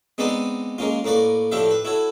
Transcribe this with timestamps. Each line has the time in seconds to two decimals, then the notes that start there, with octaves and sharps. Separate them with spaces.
0.18 G#3 B3 C4 D#4 B4 D5
0.78 G#3 A#3 C#4 F4
1.05 A2 A#3 B4 D5 C#6
1.52 A2 F3 D4 G4 E5 F5
1.71 B4
1.85 E4 F#4 A4 C#5